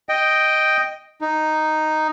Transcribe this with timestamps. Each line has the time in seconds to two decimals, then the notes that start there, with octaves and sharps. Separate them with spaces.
0.09 D#5 G5
1.21 D#4